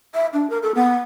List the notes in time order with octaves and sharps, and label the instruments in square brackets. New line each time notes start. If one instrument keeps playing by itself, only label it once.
[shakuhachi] E5
D4
A#4
A4
B3